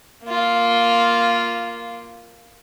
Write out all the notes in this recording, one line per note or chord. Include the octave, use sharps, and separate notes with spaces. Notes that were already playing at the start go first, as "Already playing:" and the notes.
A#3 F4